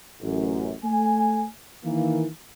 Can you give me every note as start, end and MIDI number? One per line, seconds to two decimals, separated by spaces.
0.21 0.73 33
0.21 0.73 42
0.84 1.46 57
0.84 1.46 80
1.84 2.26 51
1.84 2.26 52
1.84 2.26 58